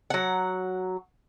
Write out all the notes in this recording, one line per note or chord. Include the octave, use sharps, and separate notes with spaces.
F#3 F#5